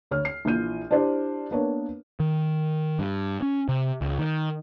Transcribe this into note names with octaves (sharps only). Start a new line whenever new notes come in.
D2 C#5 F6
C7
A#1 E3 F4 G6 D#7
D4 E4 G4 C5 D5
A#3 B3 D4 A#4 C#5
D#3
G2
C#4
C3
C#2
D#3